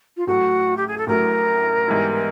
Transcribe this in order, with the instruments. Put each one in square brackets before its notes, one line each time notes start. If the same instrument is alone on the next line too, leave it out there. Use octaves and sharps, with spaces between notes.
[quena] F4
[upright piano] A1 A2 F#3 A3 [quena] F#4
[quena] G4
G#4
A4
[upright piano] A1 A2 F#3 A3 [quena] A#4
[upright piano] G#2 E3 G3 B3 E4